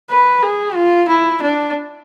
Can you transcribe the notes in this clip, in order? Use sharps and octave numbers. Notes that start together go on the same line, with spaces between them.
B4
G#4
F4
E4
D4